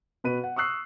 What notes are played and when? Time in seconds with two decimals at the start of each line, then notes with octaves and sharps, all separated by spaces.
0.24 B2 B4 B5 D#7
0.44 F#5
0.56 C#6 D#6 E6 F#6 C7